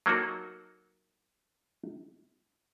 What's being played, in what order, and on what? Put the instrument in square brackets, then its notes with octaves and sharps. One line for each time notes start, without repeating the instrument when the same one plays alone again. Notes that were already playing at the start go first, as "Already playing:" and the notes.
[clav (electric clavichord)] F#3 A#3 D#4 F#4 A4